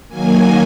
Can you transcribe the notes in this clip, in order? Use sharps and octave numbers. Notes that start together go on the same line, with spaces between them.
D#3 F#3 A#3 G#5